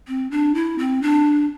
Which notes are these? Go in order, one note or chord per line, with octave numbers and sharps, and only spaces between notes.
C4
D4
E4
C4
D4